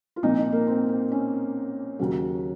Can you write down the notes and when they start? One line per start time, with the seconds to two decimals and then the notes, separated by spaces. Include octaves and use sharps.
0.16 F4
0.23 C2 A#2 F3 D#4
0.38 D#4
0.52 A#3
0.67 C4
0.89 C4
1.12 C#4
1.99 D#2 C#3 F#3